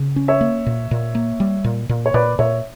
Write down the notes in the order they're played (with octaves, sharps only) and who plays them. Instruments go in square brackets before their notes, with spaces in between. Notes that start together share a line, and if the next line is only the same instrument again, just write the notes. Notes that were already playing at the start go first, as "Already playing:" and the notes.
Already playing: [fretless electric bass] C#3
C#4
[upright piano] C#5 E5
[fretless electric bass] A#3
A#2
A#2
A#3
G3
A#2
A#2
[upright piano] C#5
[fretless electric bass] A#2 [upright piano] B4 D5
[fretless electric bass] A#2 [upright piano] C#5 E5